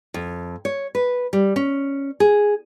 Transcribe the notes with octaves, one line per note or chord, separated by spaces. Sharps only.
F2
C#5
B4
G3
C#4
G#4